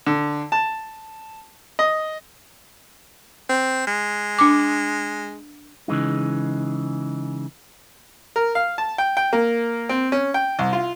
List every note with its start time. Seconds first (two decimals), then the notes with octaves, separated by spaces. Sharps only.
0.07 D3
0.52 A5
1.79 D#5
3.49 C4
3.87 G#3
4.39 D4 D6
5.88 C#3 E3 G#3 D#4
8.36 A#4
8.55 F5
8.78 A5
8.98 G5
9.17 G5
9.33 A#3
9.89 C4
10.12 C#4
10.34 G5
10.59 C2
10.73 F4